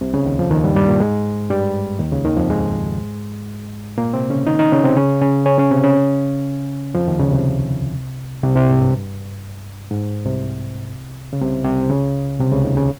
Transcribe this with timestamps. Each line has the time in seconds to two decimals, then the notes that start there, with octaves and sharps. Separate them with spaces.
0.01 C2 C3
0.13 C#2 C#3
0.26 D#2 D#3
0.39 F2 F3
0.50 D#2 D#3
0.63 G2 G3
0.76 G2 G3
0.88 A#2 A#3
1.00 G#2 G#3
1.49 G2 G3
1.99 D#2 D#3
2.12 C#2 C#3
2.24 D#2 D#3
2.37 F2 F3
2.49 G#2 G#3
3.98 A#2 A#3
4.14 C3 C4
4.30 C#3 C#4
4.47 D#3 D#4
4.59 D#3 D#4
4.72 C#3 C#4
4.84 C3 C4
4.97 C#3 C#4
5.21 C#3 C#4
5.46 C#3 C#4
5.58 C#3 C#4
5.70 C3 C4
5.84 C#3 C#4
6.95 F2 F3
7.07 D#2 D#3
7.19 C#2 C#3
7.31 C2 C3
8.43 C2 C3
8.55 C2 C3
8.68 G#2
8.80 G2
9.91 G#2
10.25 C2 C3
11.33 C#3
11.41 C2 C3
11.65 C2 C3
11.90 C#2 C#3
12.40 C2 C3
12.52 C#2 C#3
12.65 D#2 D#3
12.77 C#3